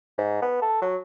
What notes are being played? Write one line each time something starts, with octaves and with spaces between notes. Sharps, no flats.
G#2
B3
A4
F#3